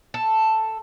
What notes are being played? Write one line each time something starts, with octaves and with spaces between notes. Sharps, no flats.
A4